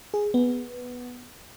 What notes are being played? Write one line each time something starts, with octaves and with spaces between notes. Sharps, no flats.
G#4
B3